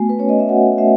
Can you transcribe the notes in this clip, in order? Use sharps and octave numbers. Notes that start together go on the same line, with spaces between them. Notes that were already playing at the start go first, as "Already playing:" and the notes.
Already playing: A3 B3 F#4 G#5
B4
C#4 C#5
D#5
E5
F#4 F#5
A3 E5